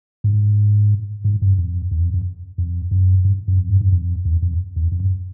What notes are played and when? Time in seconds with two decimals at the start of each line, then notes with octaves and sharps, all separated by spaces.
0.24 G#2
1.24 G#2
1.42 G2
1.58 F2
1.91 E2
2.02 F2
2.14 F2
2.58 F2
2.91 F#2
3.25 G2
3.48 F#2
3.59 F2
3.69 G2
3.81 G2
3.92 F2
4.25 E2
4.42 F2
4.76 E2
4.92 F2
5.00 F#2